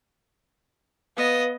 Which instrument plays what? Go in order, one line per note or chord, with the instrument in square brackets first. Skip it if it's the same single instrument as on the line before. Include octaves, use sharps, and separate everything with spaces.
[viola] B3 D#5 [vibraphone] B4 F5